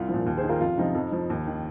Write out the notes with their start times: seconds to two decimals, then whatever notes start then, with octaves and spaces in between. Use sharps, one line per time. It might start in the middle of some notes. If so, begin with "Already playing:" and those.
Already playing: C2 F4
0.09 A#2 F3
0.26 D#2
0.37 G#4 C5
0.43 D#3
0.49 F4 A#4
0.61 F2 F4
0.77 C3 F3 D#4
0.95 F2
1.12 F3
1.30 D#2
1.47 D#3